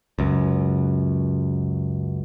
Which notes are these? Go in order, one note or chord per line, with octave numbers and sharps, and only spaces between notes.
C#2 F#2